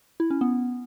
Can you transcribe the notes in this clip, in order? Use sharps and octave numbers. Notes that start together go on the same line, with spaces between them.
E4
C#4
B3